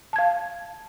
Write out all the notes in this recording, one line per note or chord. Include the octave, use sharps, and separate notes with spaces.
F5 A5 G#6